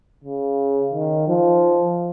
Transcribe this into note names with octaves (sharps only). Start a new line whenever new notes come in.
C#3
D#3
F3